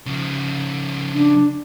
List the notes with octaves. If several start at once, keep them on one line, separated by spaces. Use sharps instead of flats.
C#3 F3
D4